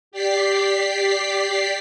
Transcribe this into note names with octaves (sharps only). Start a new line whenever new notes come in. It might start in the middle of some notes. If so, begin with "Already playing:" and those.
G4 D5 B6 C7